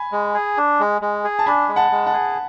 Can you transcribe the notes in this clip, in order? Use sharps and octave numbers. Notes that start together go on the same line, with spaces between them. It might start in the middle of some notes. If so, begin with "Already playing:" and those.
Already playing: G#5 B5
G#3
G#4
D4
G#3
G#3
G#4
A5
D4 G#5 B5
G#3
F#5 A5
G#3
F#5 A5
G#4